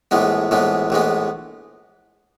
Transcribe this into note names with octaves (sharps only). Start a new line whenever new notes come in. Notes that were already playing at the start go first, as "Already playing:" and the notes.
A#1 A2 E3 G#3 B3
A#1 A2 E3 G#3 B3
A#1 A2 E3 G#3 B3